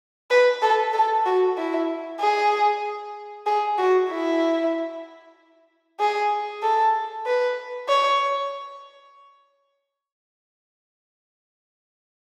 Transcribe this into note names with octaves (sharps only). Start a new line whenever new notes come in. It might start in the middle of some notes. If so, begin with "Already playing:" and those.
B4
A4
A4
F#4
E4
G#4
G#4
F#4
E4
G#4
A4
B4
C#5